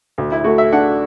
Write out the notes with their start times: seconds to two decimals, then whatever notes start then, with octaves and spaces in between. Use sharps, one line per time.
0.18 D2
0.32 E4
0.44 A3 F#4
0.58 E5
0.72 D4 F#5